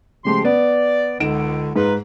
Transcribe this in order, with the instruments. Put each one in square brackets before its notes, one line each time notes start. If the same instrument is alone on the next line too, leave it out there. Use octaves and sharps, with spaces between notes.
[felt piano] C#3 G#3 A3 [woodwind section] F3 G4 C6
[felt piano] B3 [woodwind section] D5
[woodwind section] C#2 D3 [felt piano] D#4 D7 E7
[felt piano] G#2 [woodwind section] D#4 F4 B4